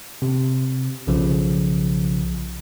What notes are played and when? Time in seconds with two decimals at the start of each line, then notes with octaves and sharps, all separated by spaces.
0.22 C3
1.07 B1 C#3 F3